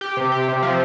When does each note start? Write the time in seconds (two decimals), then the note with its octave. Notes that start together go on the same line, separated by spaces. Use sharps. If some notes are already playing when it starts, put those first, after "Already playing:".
0.01 G4
0.17 C3
0.32 G4
0.48 C3
0.63 F3